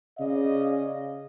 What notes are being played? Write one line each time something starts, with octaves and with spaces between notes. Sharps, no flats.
C#3 D5 D#5 F5